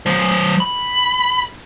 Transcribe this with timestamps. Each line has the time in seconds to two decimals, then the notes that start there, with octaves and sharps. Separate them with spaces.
0.06 F#3 C5
0.60 B5